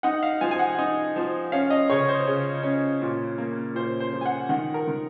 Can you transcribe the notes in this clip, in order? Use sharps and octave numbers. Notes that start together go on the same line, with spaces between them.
D#4 F#5
F5
F3 G#5
G#5
F#5
D#4
F3
C#4 F5
D#5
C#3 C#5
C5
C#3
C#4
A#2
A#3
A#2 C5
C5
F3
G#5
F#5
D#3 F#5
A#4
D#3